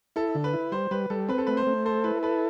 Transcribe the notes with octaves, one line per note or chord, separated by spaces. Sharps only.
E4 A4
D3
B4
E4
G3 C5
G3 B4
G3 A4
C4 B4
A4
A3 B4
C5
A3
A4 C5
E4 B4
A4 B4